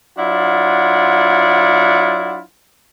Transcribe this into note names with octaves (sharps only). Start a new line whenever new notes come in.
F#3 D4 E4 F4 F#5